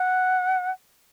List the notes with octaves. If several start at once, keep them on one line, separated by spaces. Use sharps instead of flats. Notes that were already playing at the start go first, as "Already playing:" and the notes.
Already playing: F#5